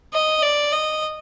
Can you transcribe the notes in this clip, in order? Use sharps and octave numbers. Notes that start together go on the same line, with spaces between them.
D#5
D5
D#5